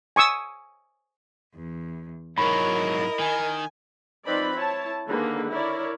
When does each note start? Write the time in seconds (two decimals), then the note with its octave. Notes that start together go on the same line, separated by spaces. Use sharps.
0.16 G#5 C#6 D#6 E6
1.54 E2
2.38 G#2 F#3 E4 A#4 C#5 D#5 B5
3.19 D#3 G#5
4.26 F3 C4 D#4 B4 D5 B5
4.55 E4 C#5 A5
5.08 D3 D#3 A#3 G#4 B4
5.50 E4 A#4 C#5 D5